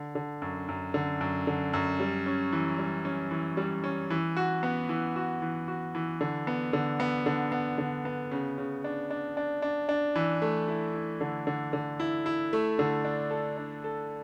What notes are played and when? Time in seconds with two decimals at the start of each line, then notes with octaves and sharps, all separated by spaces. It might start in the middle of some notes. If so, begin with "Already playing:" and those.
Already playing: D3
0.15 D3
0.42 F#2
0.69 F#2
0.94 D3
1.21 F#2
1.47 D3
1.73 F#2
2.00 G3
2.26 C#4
2.52 E3
2.79 G3
3.05 C#4
3.31 E3
3.57 G3
3.84 C#4
4.10 E3
4.37 F#4
4.63 B3
4.89 E3
5.16 F#4
5.42 E3
5.68 F#4
5.95 E3
6.21 D3
6.47 B3
6.73 D3
7.00 B3
7.26 D3
7.52 B3
7.78 D3
8.05 B3
8.31 C#3
8.58 C#3
8.84 D4
9.10 D4
9.37 D4
9.62 D4
9.89 D4
10.15 E3
10.42 A3
10.68 E4
10.94 E4
11.21 D3
11.47 D3
11.73 D3
12.00 E4
12.26 E4
12.53 A3
12.79 D3
13.05 D4
13.31 A4
13.58 D4
13.84 A4